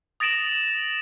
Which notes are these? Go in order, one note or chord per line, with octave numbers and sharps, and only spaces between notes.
D#6 A6 A#6 D7 E7 F#7